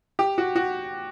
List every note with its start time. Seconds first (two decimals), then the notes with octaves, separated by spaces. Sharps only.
0.19 G4
0.38 F#4
0.56 F#4